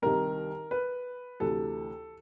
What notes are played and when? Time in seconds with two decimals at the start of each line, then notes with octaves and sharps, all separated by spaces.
0.02 C2 C3 D#3 A#4
0.71 B4
1.40 D2 C3 E3 A4